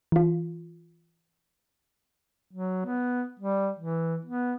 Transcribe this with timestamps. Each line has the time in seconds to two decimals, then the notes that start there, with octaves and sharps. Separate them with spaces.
0.12 E3 F4
2.51 F#3
2.85 B3
3.40 G3
3.79 E3
4.25 B3